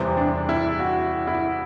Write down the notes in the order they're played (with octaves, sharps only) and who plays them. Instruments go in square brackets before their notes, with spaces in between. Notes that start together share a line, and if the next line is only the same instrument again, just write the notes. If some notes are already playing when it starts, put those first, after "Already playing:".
Already playing: [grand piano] E2 C3 E3 G3 C4
[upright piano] D4
E4
F#4
E4